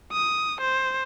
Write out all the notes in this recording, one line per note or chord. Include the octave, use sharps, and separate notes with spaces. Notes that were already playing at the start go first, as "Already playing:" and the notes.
D#6
C5